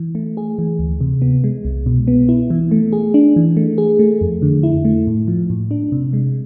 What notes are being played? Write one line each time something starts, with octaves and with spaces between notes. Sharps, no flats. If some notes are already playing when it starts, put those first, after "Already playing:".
Already playing: E3
A3
G#4
E3
D2
C3
B3
G#3
C2
B2
B3
E4
E3
A3
G#4
D4
E3
A3
G#4
A3
F2
D3
E4
A3
A2
F3
A2
D4
C3
G#3